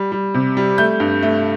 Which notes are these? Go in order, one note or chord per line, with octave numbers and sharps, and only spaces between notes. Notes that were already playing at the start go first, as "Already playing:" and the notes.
Already playing: G3
G3
C3
G3
A3 G6
G2
A3